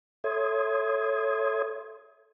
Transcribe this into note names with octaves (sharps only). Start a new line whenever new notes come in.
A4 C#5 E5 C6 D#6 G#6